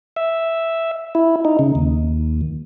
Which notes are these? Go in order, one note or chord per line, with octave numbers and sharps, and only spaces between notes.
E5
E4
D#4
C#3
D#2